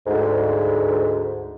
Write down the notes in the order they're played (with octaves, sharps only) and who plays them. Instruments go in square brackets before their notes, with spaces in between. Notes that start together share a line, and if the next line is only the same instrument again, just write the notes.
[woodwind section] D2 G#2